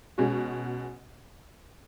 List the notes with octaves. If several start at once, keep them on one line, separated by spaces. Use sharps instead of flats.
B2 G#3 C#4 F#4